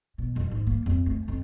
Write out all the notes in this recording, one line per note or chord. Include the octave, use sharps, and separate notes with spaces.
B2
F2
G#2
A#3
F2
A3
F2